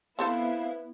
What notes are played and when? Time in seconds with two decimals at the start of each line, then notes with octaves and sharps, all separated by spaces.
0.19 B3 C4 E4 A4 C5 F5